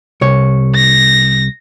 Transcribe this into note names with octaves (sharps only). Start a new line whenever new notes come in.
C2 C#5
A#6